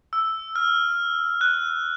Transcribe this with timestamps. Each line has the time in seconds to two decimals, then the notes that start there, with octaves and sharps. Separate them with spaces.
0.13 E6
0.56 F6
1.41 F#6